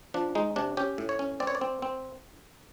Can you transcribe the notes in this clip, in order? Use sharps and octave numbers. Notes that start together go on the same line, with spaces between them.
F3 D4
G#3 D#4
C3 D4
C#4 G4
A2
C#5
C#4
C4 D5
C#5
D5
C4
C4